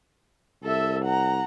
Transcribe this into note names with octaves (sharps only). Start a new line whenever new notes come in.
C2 A4 E5
F#5 A#5